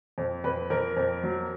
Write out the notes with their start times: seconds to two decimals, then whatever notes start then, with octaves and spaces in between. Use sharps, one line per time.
0.18 F2
0.44 F2 B4
0.70 F2 A#4
0.97 F2
1.23 F#3